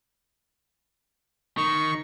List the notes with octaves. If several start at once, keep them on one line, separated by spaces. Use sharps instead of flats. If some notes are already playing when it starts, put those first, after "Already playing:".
D#3 C#6